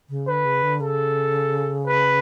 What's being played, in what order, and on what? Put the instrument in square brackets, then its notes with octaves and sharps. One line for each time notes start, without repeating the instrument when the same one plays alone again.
[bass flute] C#3
[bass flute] D3 [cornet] B4
[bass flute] C#3
D3
[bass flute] C#3 [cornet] A4
[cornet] B4